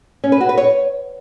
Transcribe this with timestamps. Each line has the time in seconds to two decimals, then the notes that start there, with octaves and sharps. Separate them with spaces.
0.24 C#4
0.32 B4
0.41 F#4
0.49 B4
0.57 C#5